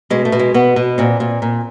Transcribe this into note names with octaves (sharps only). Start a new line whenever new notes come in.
B2 G#3
A3
B2
G#3
B2 B3
B2
A#2 C4
A#2
A#2